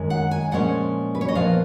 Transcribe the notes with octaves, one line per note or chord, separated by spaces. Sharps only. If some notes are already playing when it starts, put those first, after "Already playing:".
Already playing: F#2 D#3 G#3
F#5
G#5
A#2 F3 G#3 C#4 F#5
B4
C#5
D#5
A#2 F3 B3 F5